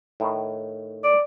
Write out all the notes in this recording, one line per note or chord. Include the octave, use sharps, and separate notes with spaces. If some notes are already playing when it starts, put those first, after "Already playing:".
A2 D#3
D5